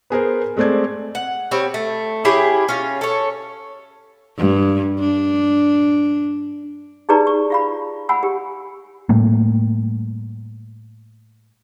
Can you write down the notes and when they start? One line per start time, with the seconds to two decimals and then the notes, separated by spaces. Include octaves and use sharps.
0.10 B3 G#4 A#4 C5
0.57 G#3 A3 C4 D5 G#6
1.15 F#5
1.51 G3 C4 C#5
1.74 A3
2.25 C#4 E4 G4 G#4
2.69 C#4 F4
3.01 A4 C#5
4.37 G2
5.00 D4
7.09 D#4 G4 G#4 B4 D5 A#5
7.27 C#6
7.50 F4 F5 B5
8.09 F#5 G#5 B5 E6
8.23 G4
9.09 A2 G3 A3 A#3